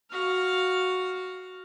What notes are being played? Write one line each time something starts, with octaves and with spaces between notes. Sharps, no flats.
F#4 F5